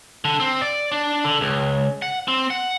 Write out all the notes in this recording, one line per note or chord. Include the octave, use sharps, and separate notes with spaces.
D3
C4
D5
D4
D3
C#2
F#5
C4
F#5